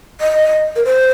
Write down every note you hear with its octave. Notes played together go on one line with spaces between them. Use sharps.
D#5
A#4
C5